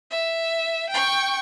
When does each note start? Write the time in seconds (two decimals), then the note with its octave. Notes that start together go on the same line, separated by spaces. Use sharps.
0.11 E5
0.90 G5 C#6